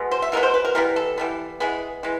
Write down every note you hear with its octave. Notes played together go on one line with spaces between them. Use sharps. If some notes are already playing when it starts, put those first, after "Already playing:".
Already playing: B2 G#3 B3
C5
E5
B2 G#3 B3 A#4
C5
B4
A#4
E3 G3 B3 A#4
A4
E3 G3 B3
E3 G#3 B3 G#4
E3 G#3